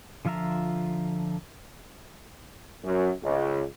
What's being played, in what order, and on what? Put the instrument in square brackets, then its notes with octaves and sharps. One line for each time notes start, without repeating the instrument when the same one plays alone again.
[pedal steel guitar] D3 F3 F4 E5 A#5
[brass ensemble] F#2
C#2